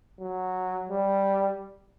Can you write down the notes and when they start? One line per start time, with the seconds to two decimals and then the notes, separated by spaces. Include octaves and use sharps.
0.20 F#3
0.89 G3